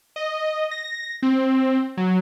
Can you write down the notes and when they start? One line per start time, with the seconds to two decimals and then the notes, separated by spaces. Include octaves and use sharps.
0.16 D#5
0.71 A#6
1.22 C4
1.97 F#3